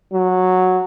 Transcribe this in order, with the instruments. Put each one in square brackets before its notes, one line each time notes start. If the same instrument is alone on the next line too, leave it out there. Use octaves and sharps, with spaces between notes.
[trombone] F#3